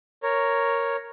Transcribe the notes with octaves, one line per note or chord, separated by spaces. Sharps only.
A#4 C#5